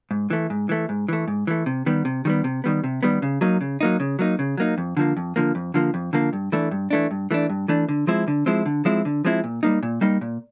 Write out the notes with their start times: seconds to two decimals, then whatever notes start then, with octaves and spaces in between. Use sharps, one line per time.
0.11 G#2
0.30 E3 A3
0.50 G#2
0.69 E3 A3
0.89 G#2
1.08 E3 A3
1.28 G#2
1.47 E3 A3
1.66 C3
1.86 D#3 G3 B3
2.05 C3
2.25 D#3 G3 B3
2.44 C3
2.64 D#3 G3 B3
2.84 C3
3.03 D#3 G3 B3
3.22 C#3
3.41 F#3 A#3 D#4
3.61 C#3
3.81 F#3 A#3 D#4
4.00 C#3
4.19 F#3 A#3 D#4
4.39 C#3
4.57 F#3 A#3 D#4
4.78 F2
4.97 D3 F3 A#3
5.17 F2
5.36 D3 F3 A#3
5.55 F2
5.74 D3 F3 A#3
5.94 F2
6.13 D3 F3 A#3
6.33 G2
6.52 E3 A3 D4
6.71 G2
6.91 E3 A3 D4
7.11 G2
7.31 E3 A3 D4
7.50 G2
7.68 E3 A3 D4
7.89 D3
8.07 F3 G#3 C4 E4
8.28 D3
8.46 F3 G#3 C4 E4
8.66 D3
8.85 F3 G#3 C4 E4
9.05 D3
9.25 F3 G#3 C4 E4
9.44 A#2
9.63 G3 A#3 D#4
9.83 A#2
10.01 G3 A#3 D#4
10.21 A#2